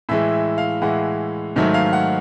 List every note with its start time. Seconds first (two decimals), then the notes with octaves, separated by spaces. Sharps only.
0.09 A2 E3 G#3 E5
0.33 E5
0.58 F5
0.82 A2 E3 G#3 F#5
1.56 G#2 D#3 F#3 A3
1.74 F5
1.93 F#5